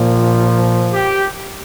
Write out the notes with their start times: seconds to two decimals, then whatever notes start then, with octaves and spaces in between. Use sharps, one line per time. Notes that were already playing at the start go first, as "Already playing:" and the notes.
Already playing: A#2 F3
0.93 G4